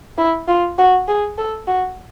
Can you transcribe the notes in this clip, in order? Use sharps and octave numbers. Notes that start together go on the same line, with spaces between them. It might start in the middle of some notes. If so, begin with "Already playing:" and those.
E4
F4
F#4
G#4
A4
F#4